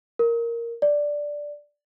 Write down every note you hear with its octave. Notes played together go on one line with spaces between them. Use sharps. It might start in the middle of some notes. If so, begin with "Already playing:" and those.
A#4
D5